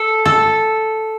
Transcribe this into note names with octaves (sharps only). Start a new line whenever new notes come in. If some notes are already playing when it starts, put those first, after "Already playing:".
Already playing: A4
A4